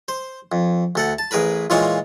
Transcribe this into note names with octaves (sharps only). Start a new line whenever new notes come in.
C5
F2
D2 A4 F#5
A5
A1 G#4 A#4 B4 B5
A#2 E3 G#3 F4 C#5 F5